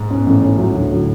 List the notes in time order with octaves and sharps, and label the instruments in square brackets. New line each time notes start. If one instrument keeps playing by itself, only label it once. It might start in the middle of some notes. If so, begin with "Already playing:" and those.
Already playing: [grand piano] G#2
[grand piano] B2 [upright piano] C#4
[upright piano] A1 [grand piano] A2
[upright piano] C#4
F#3
D2
[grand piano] A2 [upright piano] F#3